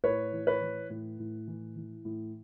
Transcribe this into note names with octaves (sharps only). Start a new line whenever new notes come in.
A2 B4 C#5
E3
B4 C#5
E3
A2
A2
E3
E3
A2